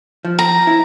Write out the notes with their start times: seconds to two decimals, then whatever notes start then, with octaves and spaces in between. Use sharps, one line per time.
0.25 F3
0.39 A#5
0.67 E4